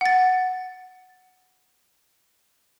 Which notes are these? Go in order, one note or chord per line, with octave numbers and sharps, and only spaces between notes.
F#5 A6